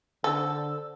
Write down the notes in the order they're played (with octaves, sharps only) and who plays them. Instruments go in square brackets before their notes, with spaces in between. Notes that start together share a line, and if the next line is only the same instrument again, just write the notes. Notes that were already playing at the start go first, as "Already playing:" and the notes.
[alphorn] D3 [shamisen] A4 [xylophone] C5 [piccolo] E6